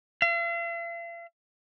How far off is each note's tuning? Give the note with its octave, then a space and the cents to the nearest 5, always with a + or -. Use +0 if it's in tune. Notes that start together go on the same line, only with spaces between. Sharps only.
F5 -45